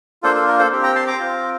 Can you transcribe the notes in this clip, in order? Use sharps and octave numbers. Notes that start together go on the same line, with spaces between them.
A#3 D4 F4 A4 C5
A4
A#4
A4 C5
C4 G4
G5 A#5
A5 C6
A#5 D6
C4 F4